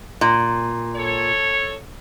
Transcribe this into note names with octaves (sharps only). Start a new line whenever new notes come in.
A#2
A4 C#5